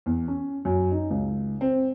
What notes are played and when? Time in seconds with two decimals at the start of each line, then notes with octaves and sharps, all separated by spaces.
0.06 E2
0.28 C#4
0.65 F#2
0.92 D#4
1.11 C#2
1.61 C4